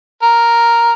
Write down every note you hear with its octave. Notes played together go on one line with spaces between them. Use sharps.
A#4